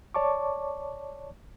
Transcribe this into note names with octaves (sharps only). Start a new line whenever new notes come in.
C#5 D5 A5 C#6 D6